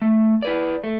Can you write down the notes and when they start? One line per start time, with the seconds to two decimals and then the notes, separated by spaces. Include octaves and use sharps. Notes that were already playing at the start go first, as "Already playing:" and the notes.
0.02 A3
0.42 E4 B4 D5
0.84 A3